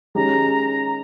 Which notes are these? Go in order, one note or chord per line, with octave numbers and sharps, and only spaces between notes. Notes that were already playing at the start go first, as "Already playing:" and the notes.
D#3 G#3 C#4 G4 A#5